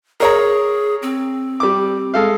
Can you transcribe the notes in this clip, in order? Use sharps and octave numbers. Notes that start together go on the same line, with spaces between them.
G#4 A#4 C#5 A#5
C4
G3 D6
G#3 A4 F5